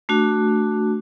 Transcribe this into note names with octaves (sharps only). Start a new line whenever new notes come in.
A3 D4 F#4